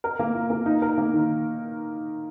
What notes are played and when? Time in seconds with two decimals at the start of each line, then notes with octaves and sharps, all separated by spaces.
0.04 A#4
0.19 A#3
0.34 F4
0.50 A#3
0.66 D#4
0.82 A#4
0.98 A#3
1.13 D#3